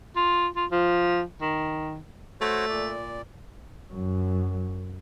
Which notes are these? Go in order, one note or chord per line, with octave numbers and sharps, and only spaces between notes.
F4
F4
F3
D#3
A3 F#4 C5 C#5
A#2 D5
F#2 F#3